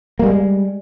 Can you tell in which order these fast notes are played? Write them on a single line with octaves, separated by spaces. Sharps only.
A#3 G3 G#3